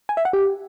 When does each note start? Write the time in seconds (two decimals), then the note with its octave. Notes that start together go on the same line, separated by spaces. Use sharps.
0.09 G#5
0.17 E5
0.25 F#5
0.33 G4